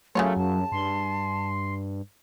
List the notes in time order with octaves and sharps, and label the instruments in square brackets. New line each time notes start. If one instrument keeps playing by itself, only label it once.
[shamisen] C#3 F4 C#5 [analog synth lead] F#3 [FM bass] A3 [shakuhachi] A#4
[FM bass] F#2 [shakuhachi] A5
[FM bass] G2 [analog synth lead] C6